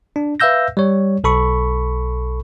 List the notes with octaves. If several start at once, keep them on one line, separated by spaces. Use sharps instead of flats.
D4
B4 E5 F5 E6 G6 A#6
G3 C#5
B1 A4 B5 C#6